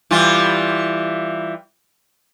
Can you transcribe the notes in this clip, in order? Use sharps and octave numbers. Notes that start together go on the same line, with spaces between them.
E3 G3 F4